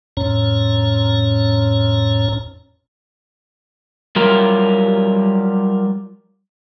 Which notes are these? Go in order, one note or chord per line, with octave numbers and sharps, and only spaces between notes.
F2 A2 C#4 C#5 A#5
F#3 G3 F4 G4 A#4